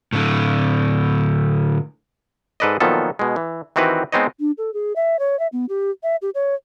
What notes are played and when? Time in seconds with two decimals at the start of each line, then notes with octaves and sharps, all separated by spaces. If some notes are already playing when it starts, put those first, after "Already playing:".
0.13 A2 D3
2.60 G#2 A4 B4 D5 D#5
2.80 A#2 D#3 F3 F#3 B3 A4
3.19 B2 G#3
3.36 E3
3.76 D#3 E3 C4 F#4 G4 B4
4.12 G#3 B3 C4 D#4 C#5 D#5
4.40 D4
4.58 A4
4.74 G#4
4.96 E5
5.19 C#5
5.39 E5
5.52 B3
5.69 G4
6.03 E5
6.22 G4
6.35 C#5